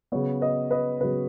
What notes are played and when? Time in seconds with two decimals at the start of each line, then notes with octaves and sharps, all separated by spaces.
0.12 C#3 F#3 B3 C#5
0.41 B4 D#5
0.71 B4 D#5
1.01 C#3 F#3 B3 B4